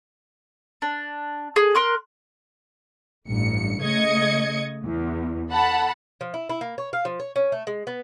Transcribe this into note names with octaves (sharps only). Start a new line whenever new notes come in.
D4
G#4
A#4 C6 F#6
A1 G2 C#7
C#3 A3 D#5 G#6 C#7
E2
A4 F#5 A5 B5
F3
E4
E4
A#3
C#5
F5
F3
C#5
C#4
A3
G#3
B3